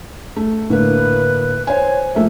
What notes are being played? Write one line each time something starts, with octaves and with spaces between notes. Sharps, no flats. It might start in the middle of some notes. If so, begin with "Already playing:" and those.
A3
A2 D3 A#3 B4
C5 C#5 G#5
F3 A3 A#3 E5